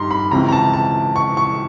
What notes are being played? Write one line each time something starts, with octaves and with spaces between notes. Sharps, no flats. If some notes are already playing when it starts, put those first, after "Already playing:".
Already playing: G2 D#3 A#5 C6
B5
C#2 C3 E3 A#5
A#5
A5
A5
C#6
C#6